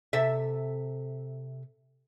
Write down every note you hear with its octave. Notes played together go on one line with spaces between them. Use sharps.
C3 A4 E5